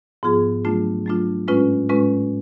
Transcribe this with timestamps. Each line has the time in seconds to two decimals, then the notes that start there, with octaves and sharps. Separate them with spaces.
0.23 G#2 F3 B3 F4 G#4
0.65 F#3 A3 D4 F4
1.06 F#3 A3 D4 F4
1.48 A2 G#3 C#4 F4 B4
1.89 A2 G#3 C#4 F4 B4